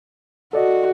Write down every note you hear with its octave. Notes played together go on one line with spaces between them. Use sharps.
F#4 A4 D5 D#5